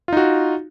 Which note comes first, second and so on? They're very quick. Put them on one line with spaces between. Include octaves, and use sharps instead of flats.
F4 D#4 F#4